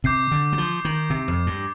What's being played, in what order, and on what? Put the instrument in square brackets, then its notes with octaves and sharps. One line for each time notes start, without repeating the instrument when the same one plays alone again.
[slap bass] C3 [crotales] D6 G6 C7
[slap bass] D3
G3
F3
D#3
C3
F2
G2